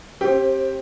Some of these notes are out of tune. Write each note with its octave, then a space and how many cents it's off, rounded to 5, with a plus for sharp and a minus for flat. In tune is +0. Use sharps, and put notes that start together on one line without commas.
C4 +35 G4 +0 C5 +15